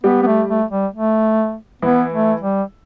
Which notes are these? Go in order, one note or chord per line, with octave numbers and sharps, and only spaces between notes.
G3 B3 G4
B3
A3
A3
G3
A3
E3 B3 E4
A3
G3